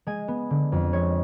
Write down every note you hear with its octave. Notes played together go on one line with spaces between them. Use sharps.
G#3 G#5
B3
D3
F2
G#3 C#5